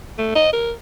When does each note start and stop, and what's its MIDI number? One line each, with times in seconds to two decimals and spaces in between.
0.18 0.32 57
0.35 0.53 75
0.53 0.72 70